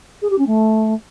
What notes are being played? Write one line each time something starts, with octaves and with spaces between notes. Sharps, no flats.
G#4
G4
C#4
A3